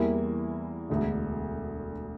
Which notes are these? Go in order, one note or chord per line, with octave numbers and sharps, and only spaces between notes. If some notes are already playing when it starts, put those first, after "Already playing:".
Already playing: E2 E3 G3 A#3 E4
E1 D2 D3